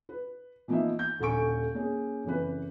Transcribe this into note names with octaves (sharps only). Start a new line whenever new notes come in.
B4
E3 F3 A#3 B3 D#4 E5
G6
D#1 D3 A4 G#5 C#6 D7
A#3 C#4 G#4
F#1 F2 E3 B4